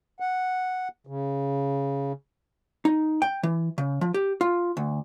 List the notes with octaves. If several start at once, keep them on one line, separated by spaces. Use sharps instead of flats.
F#5
C#3
D#4
G5
E3
C#3
F3
G4
F4
D2